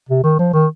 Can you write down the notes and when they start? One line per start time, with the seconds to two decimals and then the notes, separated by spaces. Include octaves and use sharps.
0.09 C3
0.23 D#3
0.39 F3
0.53 D#3